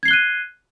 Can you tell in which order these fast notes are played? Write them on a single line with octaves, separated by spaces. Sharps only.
G#6 C7 G7 F#6 D#7